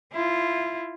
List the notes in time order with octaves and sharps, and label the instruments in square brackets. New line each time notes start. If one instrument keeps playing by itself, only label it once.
[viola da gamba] E4 F4